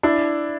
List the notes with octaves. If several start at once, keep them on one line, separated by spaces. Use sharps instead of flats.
D4 E4